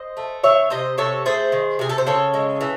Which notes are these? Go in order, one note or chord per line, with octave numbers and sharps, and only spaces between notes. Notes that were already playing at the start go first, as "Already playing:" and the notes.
Already playing: C5 D#5
A3
D#3 C#5 E5
C3 C5 D#5
C3 A4 C#5
A3 G#4 C5
D#3
C3 G#4
A4
C5
C#3 A4 C#5
G#3
E3